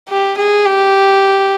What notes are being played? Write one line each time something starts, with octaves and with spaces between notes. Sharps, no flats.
G4
G#4
G4